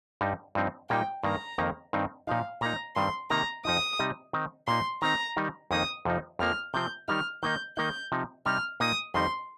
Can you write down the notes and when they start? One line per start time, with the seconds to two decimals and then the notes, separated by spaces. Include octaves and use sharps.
0.21 G2 G3 D#4
0.55 G2 F3 C4 D#4
0.89 A#2 G3 A#3 D#4 G5
1.23 G2 D#3 A#3 A#5
1.58 F2 D#3 A#3 D#4
1.93 G2 D#3 C4 D#4
2.27 A#2 F3 D#4 F5
2.61 A#2 A#3 D#4 A#5
2.95 G2 D#3 G3 C4 C6
3.30 C3 D#3 A#3 D#4 A#5
3.65 F2 F3 D#4 D#6
3.99 C3 G3 D#4
4.33 D#3 C4 D#4
4.67 A#2 A#3 D#4 C6
5.02 D#3 C4 D#4 A#5
5.37 D#3 G3 D#4
5.71 F2 D#3 A#3 D#4 D#6
6.05 F2 C3 F3 D#4
6.39 F2 F3 A#3 F6
6.74 C3 F3 C4 G6
7.08 D#3 G3 D#4 F6
7.43 D#3 A#3 D#4 G6
7.77 D#3 A#3 D#4 G6
8.12 C3 F3 D#4
8.46 C3 G3 D#4 F6
8.80 A#2 A#3 D#4 D#6
9.14 F2 D#3 G3 D#4 C6